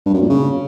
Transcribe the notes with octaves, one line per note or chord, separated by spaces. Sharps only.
G2
F#2
A#2
C#3